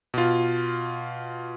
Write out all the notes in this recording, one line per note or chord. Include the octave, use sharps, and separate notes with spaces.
B2 F4